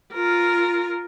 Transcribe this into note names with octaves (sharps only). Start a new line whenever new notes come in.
F4 A#4